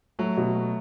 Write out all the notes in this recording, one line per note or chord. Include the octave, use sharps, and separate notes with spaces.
F#3 A3
B2
A3